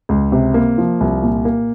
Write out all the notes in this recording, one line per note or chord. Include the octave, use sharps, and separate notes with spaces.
C#2
C3
A#3
F3
C2
A#2
A#3